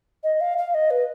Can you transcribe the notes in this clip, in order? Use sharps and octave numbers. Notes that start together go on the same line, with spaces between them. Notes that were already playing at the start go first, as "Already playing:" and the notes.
D#5
F5
F5
D#5
B4